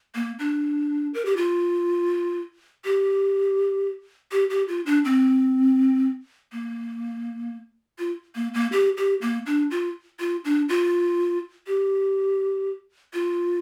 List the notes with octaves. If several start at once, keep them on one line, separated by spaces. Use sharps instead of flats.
A#3
D4
A#4
G4
F4
G4
G4
G4
F4
D4
C4
A#3
F4
A#3
A#3
G4
G4
A#3
D4
F4
F4
D4
F4
G4
F4